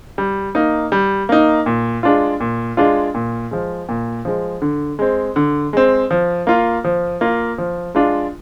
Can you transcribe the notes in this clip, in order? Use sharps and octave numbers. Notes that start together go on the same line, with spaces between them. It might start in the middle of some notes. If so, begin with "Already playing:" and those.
G3
A#3 D#4
G3
A#3 D#4
A#2
G#3 D4 F4
A#2
G#3 D4 F4
A#2
F3 G#3
A#2
F3 G#3
D3
G#3 C4
D3
G#3 C4
F3
A#3 F4
F3
A#3 F4
F3
G#3 D4 F4